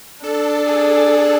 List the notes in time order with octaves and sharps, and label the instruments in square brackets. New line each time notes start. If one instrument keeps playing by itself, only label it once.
[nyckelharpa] D4 [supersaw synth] A4
[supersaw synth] G#4